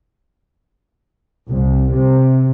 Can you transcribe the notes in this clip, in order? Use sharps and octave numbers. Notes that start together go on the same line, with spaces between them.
C2
C3